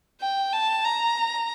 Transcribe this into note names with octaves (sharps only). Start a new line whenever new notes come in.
G5
A5
A#5